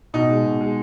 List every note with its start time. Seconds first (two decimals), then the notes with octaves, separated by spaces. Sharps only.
0.14 B2 D#4
0.30 G#3
0.45 B2
0.61 G#3